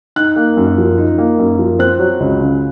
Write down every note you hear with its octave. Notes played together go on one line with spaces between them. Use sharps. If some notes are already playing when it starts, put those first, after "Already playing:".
D#4 F#6
A#3
F#2
F3
D#4
A#3
F#2
F3
C4 F#6
F#3
C#2
C#3